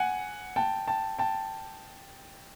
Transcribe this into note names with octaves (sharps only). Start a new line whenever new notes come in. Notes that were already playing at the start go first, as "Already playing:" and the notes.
Already playing: F#5 G#5
G5 A5
G5 A5
G5 A5